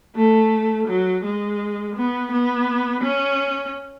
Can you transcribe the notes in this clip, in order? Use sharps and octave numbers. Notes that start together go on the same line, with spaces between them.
A3
F#3
G#3
B3
B3
C#4